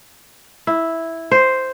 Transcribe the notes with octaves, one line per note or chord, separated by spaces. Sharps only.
E4
C5